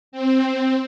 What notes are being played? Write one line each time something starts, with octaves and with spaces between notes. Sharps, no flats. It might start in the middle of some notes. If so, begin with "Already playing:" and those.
C4